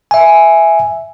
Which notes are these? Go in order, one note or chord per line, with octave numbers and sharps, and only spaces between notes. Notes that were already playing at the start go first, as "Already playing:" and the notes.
E5 G#5